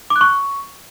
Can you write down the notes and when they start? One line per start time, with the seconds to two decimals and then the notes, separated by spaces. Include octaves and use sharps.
0.10 D6
0.16 F#6
0.21 C#6